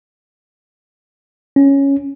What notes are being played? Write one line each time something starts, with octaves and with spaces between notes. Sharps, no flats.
C#4